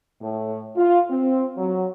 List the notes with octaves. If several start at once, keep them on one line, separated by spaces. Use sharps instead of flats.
A2
F4
C4
F#3